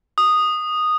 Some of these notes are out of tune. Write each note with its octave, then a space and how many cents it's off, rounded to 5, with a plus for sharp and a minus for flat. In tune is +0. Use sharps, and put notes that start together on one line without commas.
D#6 -10